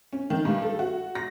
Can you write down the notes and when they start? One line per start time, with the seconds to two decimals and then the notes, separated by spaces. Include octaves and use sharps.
0.13 C#4
0.30 D#3
0.45 G2
0.62 A4
0.79 F#4
1.15 A#6